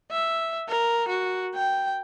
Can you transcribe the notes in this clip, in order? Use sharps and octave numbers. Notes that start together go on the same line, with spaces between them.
E5
A#4
F#4
G5